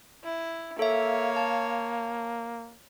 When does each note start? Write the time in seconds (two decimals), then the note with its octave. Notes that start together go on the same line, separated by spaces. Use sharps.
0.24 E4
0.79 A#3 A4 C#5 E5 F5
1.36 A5